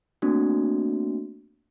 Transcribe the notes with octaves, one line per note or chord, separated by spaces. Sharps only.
A3 A#3 C4 D4 F#4